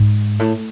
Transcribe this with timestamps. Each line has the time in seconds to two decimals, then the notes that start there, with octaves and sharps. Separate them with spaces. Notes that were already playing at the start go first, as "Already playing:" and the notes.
Already playing: G#2
0.39 A2